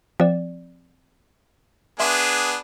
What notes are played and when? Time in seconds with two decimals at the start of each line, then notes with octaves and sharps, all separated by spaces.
0.20 F3 C4 D5
2.00 B3 D4 G#4 E5 C6